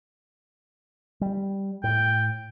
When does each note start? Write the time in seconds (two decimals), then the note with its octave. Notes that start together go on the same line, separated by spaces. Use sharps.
1.21 G3
1.84 A2 G5